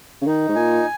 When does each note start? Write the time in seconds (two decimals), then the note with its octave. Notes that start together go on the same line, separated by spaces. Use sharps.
0.22 C#3
0.26 D#3 D#4
0.48 G#2
0.55 A#2 G#5